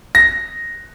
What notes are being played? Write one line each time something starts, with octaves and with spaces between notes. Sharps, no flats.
A#6